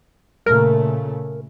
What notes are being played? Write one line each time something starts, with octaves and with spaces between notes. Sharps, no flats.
A#2 C#3 A3 A#4